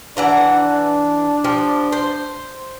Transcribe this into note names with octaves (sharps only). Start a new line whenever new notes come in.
E3 D4 F#5 A#5
D4
F3 G4
C5